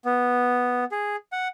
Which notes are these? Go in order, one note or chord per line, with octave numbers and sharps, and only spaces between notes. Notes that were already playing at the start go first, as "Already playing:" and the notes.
B3
G#4
F#5